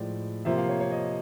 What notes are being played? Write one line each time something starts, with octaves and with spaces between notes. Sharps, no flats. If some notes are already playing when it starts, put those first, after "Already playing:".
Already playing: A2 F3 G#3 D5
C3 F3 A#3 E5
F5
C#5
C#5
D#5